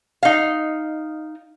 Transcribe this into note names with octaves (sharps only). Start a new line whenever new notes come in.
D#4 F5